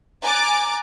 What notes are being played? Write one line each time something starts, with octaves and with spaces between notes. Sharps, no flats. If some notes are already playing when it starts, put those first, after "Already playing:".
G#5 A#5 D6 F#6 A6